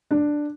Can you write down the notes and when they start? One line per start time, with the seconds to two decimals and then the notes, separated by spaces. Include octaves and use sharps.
0.11 D4